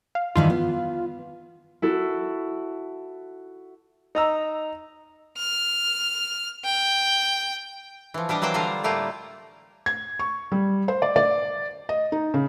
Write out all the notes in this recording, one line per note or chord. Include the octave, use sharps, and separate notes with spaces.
F5
G2 D#3 E3 F4
B3
E4 F#4 A4
D#4 A#5 E6
F6
G5
E3 F3
G3 D4 G4 D#5
E3 F#3 A#3 C5 G5
D3 G3 D4 F4 A#5
A2 G3 A3 A#3 F4
G#6
C#6
G3
C5
D5
D5
D#5
D#4
C#3